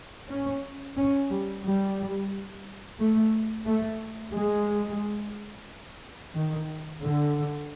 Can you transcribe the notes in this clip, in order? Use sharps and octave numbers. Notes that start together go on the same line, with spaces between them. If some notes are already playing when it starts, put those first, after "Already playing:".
C#4
C#4
G3
G3
A3
A3
G#3
D#3
D3